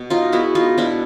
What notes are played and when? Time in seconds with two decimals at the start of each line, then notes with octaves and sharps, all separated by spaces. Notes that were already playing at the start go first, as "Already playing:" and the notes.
Already playing: B2
0.10 D#4 F4
0.32 G#3 B3 E4 F#4
0.55 D#4 F4
0.78 B2 D4 E4